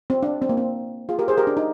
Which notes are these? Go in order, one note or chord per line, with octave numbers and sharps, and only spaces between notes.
C4
D4
C4
A#3
C4
F4 G#4
G4 A#4
G#4 C5
G4 A#4
D4
D#4